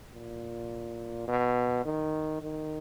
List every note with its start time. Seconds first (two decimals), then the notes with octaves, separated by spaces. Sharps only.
0.14 A#2
1.28 B2
1.85 D#3
2.42 D#3